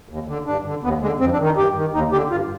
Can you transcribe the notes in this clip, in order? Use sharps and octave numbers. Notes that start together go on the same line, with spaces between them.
D#2
D3
G2 D4
D3
D#2 B3
D3 G#3
F2 C4
D4
D#3
D#4
G2 G4
D#3
D#2 D#4
D3 G4
G2 F4